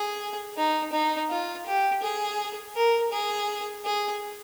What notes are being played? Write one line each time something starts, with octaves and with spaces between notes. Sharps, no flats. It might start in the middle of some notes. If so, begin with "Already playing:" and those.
Already playing: G#4
D#4
D#4
F4
G4
G#4
A#4
G#4
G#4